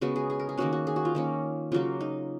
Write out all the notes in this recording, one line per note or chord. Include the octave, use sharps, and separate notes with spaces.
C#3 G#3 B3 F#4
G#4
G#4
A#4
G#4
D#3 A#3 C#4 F#4
F#4
G#4
F#4
F4
D#3 A#3 C#4
C#3 F#3 A#3 F4
D#4